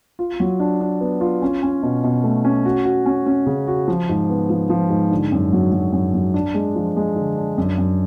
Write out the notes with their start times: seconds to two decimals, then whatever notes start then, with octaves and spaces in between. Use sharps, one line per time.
0.19 F4
0.40 F#3
0.60 D4
0.81 D4
1.01 B3
1.21 F4
1.42 C#4
1.63 C#4
1.83 B2
2.04 B2
2.24 A3
2.45 C#4
2.65 F#4
2.85 F#4
3.06 C#4
3.26 C#4
3.46 C#3
3.67 F#4
3.88 F3
4.09 G#2
4.30 B3
4.50 F3
4.70 F3
4.90 G#2
5.11 D3
5.32 F#2
5.53 F#3
5.72 F#3
5.93 F#2
6.14 F#3
6.34 D4
6.54 G#3
6.75 F3
6.96 G#3
7.16 D3
7.37 D4
7.57 F#2
7.78 F#2